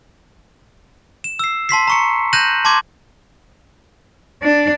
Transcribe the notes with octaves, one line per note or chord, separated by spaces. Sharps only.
E7
E6 C7
A5 C6 B6 C7
A#5 C#6 C#7
F#6 G6 A#6 D#7 E7 F#7
A5 C6 D6 G#6
D4